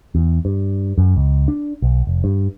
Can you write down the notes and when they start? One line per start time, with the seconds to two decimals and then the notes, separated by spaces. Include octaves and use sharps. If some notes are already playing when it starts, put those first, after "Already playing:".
0.15 E2
0.45 G2
0.98 F#2
1.16 C#2
1.48 D4
1.82 B1
2.07 F1
2.24 G2